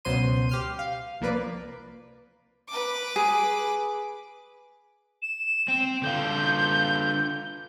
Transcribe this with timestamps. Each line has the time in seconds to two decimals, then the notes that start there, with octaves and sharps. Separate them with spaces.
0.05 C#2 B2 F#3 C5 C6 D#7
0.49 G4 F6 C7
0.79 F5
1.21 C2 F3 A#3 B4 D5
2.69 B4 D6
3.16 G#4
5.22 E7
5.69 C4
6.03 D3 F4 G6